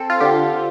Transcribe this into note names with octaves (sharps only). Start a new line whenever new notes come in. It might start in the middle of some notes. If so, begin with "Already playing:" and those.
Already playing: C4 A4
F4
D3 G4